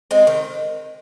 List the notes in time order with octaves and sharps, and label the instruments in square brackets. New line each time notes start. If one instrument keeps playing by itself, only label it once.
[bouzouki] G#3 C4
D#3